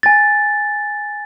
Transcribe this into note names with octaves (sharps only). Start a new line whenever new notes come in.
G#5 A6